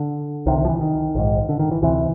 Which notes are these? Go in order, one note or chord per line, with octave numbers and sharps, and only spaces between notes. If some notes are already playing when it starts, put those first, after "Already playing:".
Already playing: D3
C2 C3 D#3
D#3
F3
E3
D#3
A#1 G#2
D3
D#3
E3
D2 C3 E3